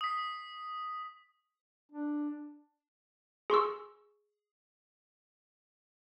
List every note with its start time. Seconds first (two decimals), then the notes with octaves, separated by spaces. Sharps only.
0.01 D#6 B6
1.92 D4
3.50 G#4 C6 C#6 E6